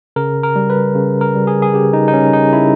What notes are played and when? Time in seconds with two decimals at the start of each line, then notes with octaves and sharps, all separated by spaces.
0.16 C#3 A#4
0.43 A#4
0.56 G3
0.70 B4
0.95 C#3
1.21 A#4
1.35 G3
1.47 G#4
1.62 G#4
1.74 C#3 G4
1.93 D#4
2.08 D#4
2.13 G3 C#4
2.33 D#4
2.53 C#3 E4